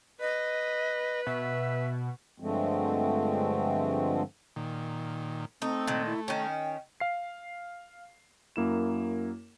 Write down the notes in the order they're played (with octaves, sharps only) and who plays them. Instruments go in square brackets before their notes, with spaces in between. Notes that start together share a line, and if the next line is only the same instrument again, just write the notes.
[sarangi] B4 [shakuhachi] D#5
[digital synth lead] B2 [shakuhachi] E5
[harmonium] G2 D3 F3 G#3 A3 C4
[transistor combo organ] A#2 D#3
[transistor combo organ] A3 [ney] C4 [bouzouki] D#4
[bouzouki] A#2 D#3
[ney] E4
[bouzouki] D#3 C#4 [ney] G5
[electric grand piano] F5 C7
F#2 A#3 E4 E7